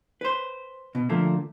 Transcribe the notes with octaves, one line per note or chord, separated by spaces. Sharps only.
B4 C5
B2
D3 F3 A3 A#3